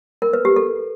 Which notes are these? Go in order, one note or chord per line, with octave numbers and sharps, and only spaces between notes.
A#4
B4
G4
A4